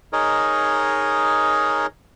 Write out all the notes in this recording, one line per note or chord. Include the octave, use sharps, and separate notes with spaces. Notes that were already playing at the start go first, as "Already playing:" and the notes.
D#4 G#4 A#4 C#5 D#5